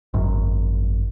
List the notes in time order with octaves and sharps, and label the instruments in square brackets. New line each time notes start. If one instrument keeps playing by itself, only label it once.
[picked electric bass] G#1 F#2